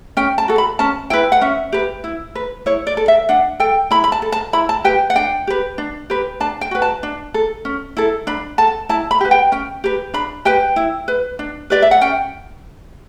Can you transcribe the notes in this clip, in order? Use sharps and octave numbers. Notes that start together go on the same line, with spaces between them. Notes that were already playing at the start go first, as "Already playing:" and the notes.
C#4 G5
A5
F#4 A4
B5
C#4 A5
E4 B4 G5
F#5
C#4 E5
G4 B4
E4
B4
E4 C#5
D5
A4
E5
D4 F#5
A4 G5
E4 B5
B5
A5
A4
A5
E4 B5
A5
G4 B4 G5
F#5
D4 G5
G4 B4
D4
G4 B4
D4 A5
G5
F#4 B4
A5
D4
A4
C#4
E4 A4
D4 B5
A4 A5
E4 A5
B5
G4 B4
G5
C#4 G5
G4 B4
D4 B5
G4 B4 G5
E4
B4
D4
G4 B4 D5
E5
F#5
C#4 G5